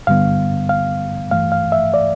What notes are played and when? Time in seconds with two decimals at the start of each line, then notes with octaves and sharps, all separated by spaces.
0.07 G2 D3 G3 B3 F5
0.69 F5
1.31 G2 E3 A3 F5
1.52 F5
1.72 E5
1.94 D5